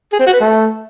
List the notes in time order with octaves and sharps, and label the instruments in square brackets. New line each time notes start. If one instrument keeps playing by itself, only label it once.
[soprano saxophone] G#4
C4
F#4
B4
A3